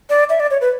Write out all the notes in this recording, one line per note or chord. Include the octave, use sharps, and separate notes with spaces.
D5
E5
D5
C#5
B4